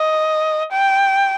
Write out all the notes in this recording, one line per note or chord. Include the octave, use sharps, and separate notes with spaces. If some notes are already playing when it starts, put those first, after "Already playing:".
Already playing: D#5
G5